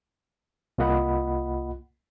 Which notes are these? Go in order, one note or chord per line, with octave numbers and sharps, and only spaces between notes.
C2 A#3 F4 D#5 F#5 B5